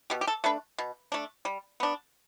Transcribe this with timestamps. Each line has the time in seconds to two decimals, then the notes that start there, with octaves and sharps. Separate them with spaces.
0.10 B2 G4
0.21 G4
0.27 A4
0.44 A3 D4 B4
0.78 B2
1.12 A3 D4
1.45 G3
1.80 B3 D4